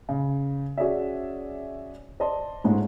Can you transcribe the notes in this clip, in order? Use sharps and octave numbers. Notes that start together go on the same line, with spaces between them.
C#3
C#4 F#4 G#4 C#5 D5 E5
C5 D5 D#5 A5 C6
G#2 G#3 A3 C#4 F4